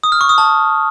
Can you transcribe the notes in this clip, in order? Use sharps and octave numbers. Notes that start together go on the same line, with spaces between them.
D#6
F6
C#6
D#6
A5